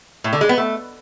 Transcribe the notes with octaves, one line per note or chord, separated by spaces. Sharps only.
A2
D3
G#3
B3
A3